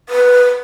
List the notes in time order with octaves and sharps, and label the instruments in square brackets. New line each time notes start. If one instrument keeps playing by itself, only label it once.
[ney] B4